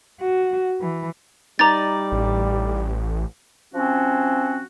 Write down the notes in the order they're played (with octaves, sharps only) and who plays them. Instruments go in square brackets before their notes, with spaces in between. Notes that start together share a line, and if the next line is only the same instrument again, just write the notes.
[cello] F#4
E3
[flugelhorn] G3 [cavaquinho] D#4 D5 [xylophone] A#5 A6
[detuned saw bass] A1
[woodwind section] F3 C4 C#4 F#4